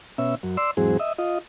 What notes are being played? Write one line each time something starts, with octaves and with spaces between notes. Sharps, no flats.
B2 C#4 E5
F#2
D5 C6 E6
E2 G#2 F#3 C4 G#4
D#5 E5
F4 D#5